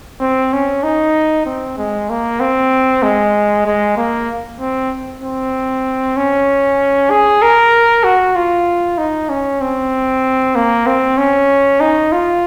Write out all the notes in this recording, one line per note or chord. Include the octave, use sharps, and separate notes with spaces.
C4
C#4
D#4
C4
G#3
A#3
C4
G#3
G#3
A#3
C4
C4
C#4
G#4
A#4
F#4
F4
D#4
C#4
C4
A#3
C4
C#4
D#4
F4